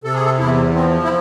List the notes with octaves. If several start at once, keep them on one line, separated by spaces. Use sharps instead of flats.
C3 A4
G#4
A4
E2 E4
F3 C4
E4